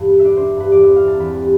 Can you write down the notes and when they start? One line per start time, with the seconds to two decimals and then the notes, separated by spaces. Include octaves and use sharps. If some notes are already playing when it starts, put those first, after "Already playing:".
Already playing: E2 G2 B2 G3
0.09 B3
0.19 E5
0.24 D4 D5
0.37 D4 C5
0.56 G2 B4
0.72 E2 D5
0.84 C4 E5
0.96 F5
1.04 C4 A5
1.19 E2 B5
1.35 G3